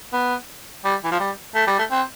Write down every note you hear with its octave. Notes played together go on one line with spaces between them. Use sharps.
B3
G3
E3
F3
G3
A3
G3
A3
C4